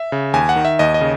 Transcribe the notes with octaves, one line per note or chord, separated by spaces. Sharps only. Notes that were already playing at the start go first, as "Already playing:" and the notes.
Already playing: E5
C#3
D#2 G#5
F#5
D#3
E5
D#2 D#5
D#5
C#3